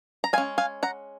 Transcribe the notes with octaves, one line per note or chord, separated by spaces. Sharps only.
A#5
G#3 C#4 F5 G#5
F5 G#5
F#5 A#5